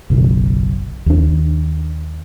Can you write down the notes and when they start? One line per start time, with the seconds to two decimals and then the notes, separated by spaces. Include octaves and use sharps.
0.10 F#1 B1
1.06 D#2 D4